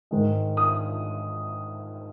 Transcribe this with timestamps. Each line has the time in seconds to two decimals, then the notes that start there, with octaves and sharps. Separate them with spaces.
0.11 G#2 D#3 G#3
0.57 D#6